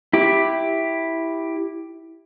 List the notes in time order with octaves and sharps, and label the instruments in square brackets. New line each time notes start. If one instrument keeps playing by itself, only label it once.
[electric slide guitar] E4 G4